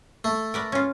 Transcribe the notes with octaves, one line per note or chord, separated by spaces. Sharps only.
A3
A#4 B4 D5
C#4 F4